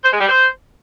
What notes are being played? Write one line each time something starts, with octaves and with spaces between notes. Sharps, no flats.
C5
G#3
G3
C5